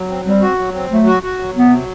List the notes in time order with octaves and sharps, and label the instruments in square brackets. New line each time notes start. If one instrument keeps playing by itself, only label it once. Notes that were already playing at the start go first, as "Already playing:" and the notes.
Already playing: [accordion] F#3
C4
[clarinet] G3 [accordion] C4
[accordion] F#4
F#3
C4
[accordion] F#3 [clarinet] A3
[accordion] F#4
F#4
F#3
[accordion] C3 [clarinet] B3
[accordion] F#3